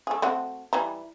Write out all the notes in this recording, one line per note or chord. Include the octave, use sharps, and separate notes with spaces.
A3 G#4
A3 C4 F#4
E3 G3 A#5